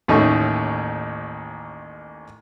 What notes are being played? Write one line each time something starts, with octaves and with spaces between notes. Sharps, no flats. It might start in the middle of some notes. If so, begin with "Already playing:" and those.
A1 D#2 A2 C#4 D#4 C#6